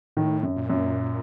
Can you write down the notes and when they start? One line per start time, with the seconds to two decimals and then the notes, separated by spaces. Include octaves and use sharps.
0.17 A2 D#3
0.43 F#2
0.56 A#2
0.70 F#2